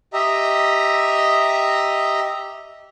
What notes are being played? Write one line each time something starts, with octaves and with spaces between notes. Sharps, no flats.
G4 D#5 E5 A#5